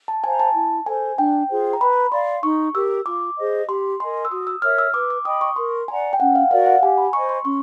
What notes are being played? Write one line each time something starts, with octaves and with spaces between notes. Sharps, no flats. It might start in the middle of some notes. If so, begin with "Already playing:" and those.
A5
C5 F5 G#5 A#5
A5
E4
A4 C5 G#5
D4 G5
F4 G#4 C5
A#5
B4 B5
D5 F5 C6
D#4 C#6
G4 A#4 E6
F4 D6
G#4 C5 D#5
G4 C6
A#4 D#5 G#5 C6
E6
F#4 D#6
E6
A#4 C#5 E5 F6
E6
B4 D6
D6
D#5 G5 B5 D#6
C#6
A#4 C6
D5 F#5 G#5 A#5
G5
C#4 F#5
F5
F#4 A#4 D5 F5
F#5
G4 G#5
B5
C5 D#5 G#5 C#6
C6
C#4 C#6